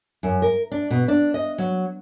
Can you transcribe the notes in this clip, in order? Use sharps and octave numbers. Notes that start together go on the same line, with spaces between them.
F#2
A#4
D4
B2
D4
D#5
F#3